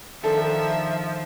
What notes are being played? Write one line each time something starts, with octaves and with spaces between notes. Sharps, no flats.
D#3 F3 D4 A4 E5